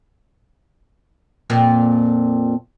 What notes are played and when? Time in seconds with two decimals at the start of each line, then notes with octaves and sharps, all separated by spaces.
1.50 F2 A#2 A#3